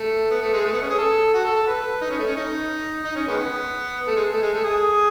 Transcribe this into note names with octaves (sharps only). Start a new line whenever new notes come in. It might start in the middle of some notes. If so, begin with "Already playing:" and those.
Already playing: A3
B3
A3
G#3
A3
B3
C#4
G#4
A4
F#4
A4
A4
B4
D#4
C#4
A3
C#4
D#4
D#4
C#4
D#3 G#3 B3
A3
G#3
A3
G#3
A3
G#4